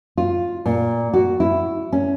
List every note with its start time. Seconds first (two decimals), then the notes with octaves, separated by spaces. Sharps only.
0.18 F4
0.66 A#2
1.13 F#4
1.40 E4
1.93 C#4